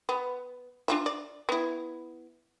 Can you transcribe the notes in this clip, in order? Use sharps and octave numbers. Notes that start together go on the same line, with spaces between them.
B3
D4 F4 E5
D5
B3 E4